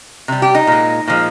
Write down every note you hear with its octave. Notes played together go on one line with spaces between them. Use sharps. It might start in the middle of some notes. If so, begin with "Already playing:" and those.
C3 G3
G4
D#4
A#2 G#3
A#2 F3 G#3